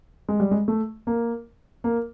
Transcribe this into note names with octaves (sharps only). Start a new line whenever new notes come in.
G#3
G3
G#3
A3
A#3
A#3